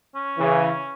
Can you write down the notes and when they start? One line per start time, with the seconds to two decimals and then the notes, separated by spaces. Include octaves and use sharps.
0.15 C#4
0.38 C#3 E3